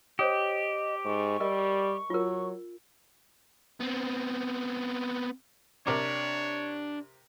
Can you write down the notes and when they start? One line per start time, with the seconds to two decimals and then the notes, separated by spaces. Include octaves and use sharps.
0.19 G4 C5 C#5 D#5 D#6
1.04 G#2 C#6
1.40 G3 A#4 D#5
2.10 F#3 F4 A#4
3.80 B3 C4
5.87 C3 D4 A#4 C#5 D6